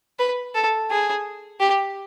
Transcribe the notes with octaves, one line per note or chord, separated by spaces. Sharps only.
B4
A4
G#4
G4